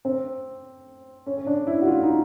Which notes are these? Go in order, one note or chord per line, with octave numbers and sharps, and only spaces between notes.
C4
C#4
C#4
D4
E4
F#4
F4
D#4